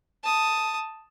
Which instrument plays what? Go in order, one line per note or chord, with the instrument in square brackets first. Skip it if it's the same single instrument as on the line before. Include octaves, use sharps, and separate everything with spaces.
[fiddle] A5 D#6